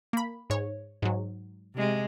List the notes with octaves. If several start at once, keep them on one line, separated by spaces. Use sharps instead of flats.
A#3 B5
G#2 C#5
G#2 F#3
C3 G#3